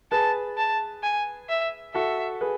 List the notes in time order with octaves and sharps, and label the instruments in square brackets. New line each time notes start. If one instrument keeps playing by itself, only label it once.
[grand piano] G#4 B4 [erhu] A5
[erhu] A5
G#5
E5
[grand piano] F#4 A4 [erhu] E5
[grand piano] G#4 B4